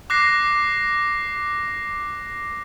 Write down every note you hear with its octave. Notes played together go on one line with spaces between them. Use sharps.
D6 F#6 A#6 C7